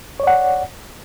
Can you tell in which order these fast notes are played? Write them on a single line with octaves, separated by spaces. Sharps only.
C#5 D5 F#5